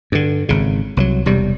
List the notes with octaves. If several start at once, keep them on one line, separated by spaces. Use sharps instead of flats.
G2 D3
G#1 C#3
C2 F3 F#3
E1 C3 G3